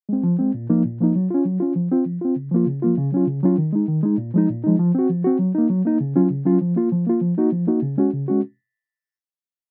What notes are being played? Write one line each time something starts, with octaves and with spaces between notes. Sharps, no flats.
G#3 C4
F3
G#3 C4
A#2
F3 A#3 D#4
A#2
F3 A#3 D#4
F#3
C#4 F4
F#3
C#4 F4
F3
C4 F4
F3
C4 F4
C#3
F3 A#3 F4
C#3
F3 A#3 F4
C#3
F#3 C#4 F4
C#3
F#3 C#4 F4
D#3
G#3 D#4
D#3
G#3 D#4
A#2
F3 G#3 D#4
A#2
F3 G#3 D#4
F3
C4 F#4
F3
C4 F#4
F#3
A#3 D#4
F#3
A#3 D#4
C#3
F#3 C#4 F4
C#3
F#3 C#4 F4
F3
A#3 F4
F3
A#3 F4
F3
A#3 D#4 F#4
F3
A#3 D#4 F#4
C#3
G#3 C#4 F#4
C#3
G#3 C#4 F#4